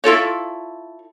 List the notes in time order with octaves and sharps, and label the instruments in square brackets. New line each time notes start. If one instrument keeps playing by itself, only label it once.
[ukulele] E4 F4 A4 C#5